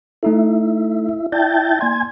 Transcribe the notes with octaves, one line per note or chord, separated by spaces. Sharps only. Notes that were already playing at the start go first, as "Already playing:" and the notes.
A3 D#4 E4 A4
E4 D5 G5 A5
A#3 D5 G#5 C6